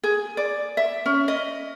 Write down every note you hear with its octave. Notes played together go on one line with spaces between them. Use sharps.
G#4
D5
E5
C#4
D#5